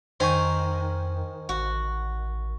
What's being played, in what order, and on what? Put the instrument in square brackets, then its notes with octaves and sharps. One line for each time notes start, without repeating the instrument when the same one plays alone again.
[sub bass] F2 [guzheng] D#3 [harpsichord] C5 G#5 C#6
[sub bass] A1 [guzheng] F#4